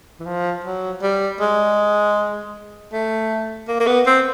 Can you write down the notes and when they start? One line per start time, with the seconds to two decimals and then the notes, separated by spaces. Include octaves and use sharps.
0.20 E3
0.26 F3
0.64 F#3
1.02 G3
1.41 G#3
2.93 A3
3.68 A#3
3.80 A#3
3.87 B3
4.06 C4